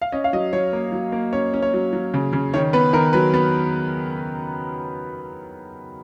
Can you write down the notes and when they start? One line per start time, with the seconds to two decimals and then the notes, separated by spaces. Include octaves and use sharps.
0.02 F5
0.12 C#4 D#5
0.24 F5
0.33 F#3 D#5
0.53 F#3 C#5
0.73 A#3
0.92 F#3
1.12 A#3
1.33 C#4 C#5
1.54 C#4
1.62 C#5
1.73 F#3
1.93 F#3
2.14 C#3
2.33 C#3
2.54 D#3 C#5
2.73 B3 B4
2.93 D#3 A#4
3.13 F#3 B4
3.34 B3